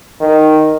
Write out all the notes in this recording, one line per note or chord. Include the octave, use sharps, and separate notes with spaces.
D#3